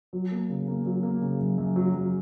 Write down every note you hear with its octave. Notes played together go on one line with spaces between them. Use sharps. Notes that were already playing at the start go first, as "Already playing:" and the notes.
F#3
A#3
C#3
A#3
F#3
A#3
C#3
F#2
F#2
F#3
F#3